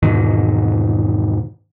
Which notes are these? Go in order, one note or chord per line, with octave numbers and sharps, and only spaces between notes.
E2 G#2 B2 D#3